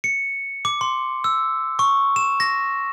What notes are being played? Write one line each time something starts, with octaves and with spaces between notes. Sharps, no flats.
C#7
D6
C6
E6
C#6
E7
A#6